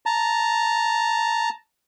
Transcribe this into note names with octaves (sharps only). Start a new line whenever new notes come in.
A5 A#5